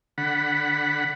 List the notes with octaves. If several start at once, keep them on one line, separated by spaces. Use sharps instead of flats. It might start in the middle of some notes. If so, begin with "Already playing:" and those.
D3 F#5 B5